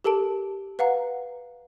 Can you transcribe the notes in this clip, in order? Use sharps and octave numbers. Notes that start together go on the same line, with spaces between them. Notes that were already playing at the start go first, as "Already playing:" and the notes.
G4 A4 A#4 A5 D7
B4 F5 F#5 A#5